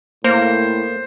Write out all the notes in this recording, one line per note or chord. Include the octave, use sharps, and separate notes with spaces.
A2 A#3 C5